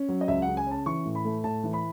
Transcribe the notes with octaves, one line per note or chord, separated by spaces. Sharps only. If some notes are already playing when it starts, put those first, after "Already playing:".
Already playing: C#4
F#3
D#5
C#2 E5
F#5
C#3
G#5
C#4 A5
E3 C#6
A2
B5
A3
A2 A5
E3
B5